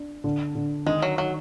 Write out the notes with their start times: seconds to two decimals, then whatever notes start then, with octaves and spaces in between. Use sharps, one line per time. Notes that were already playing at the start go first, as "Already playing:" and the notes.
Already playing: D4
0.24 D3
0.55 D3
0.86 D#3 G#3
1.02 F#3
1.18 F#3 D#4